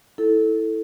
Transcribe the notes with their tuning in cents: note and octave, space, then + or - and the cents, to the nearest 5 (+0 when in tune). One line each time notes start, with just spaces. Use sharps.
E4 -10 A4 +0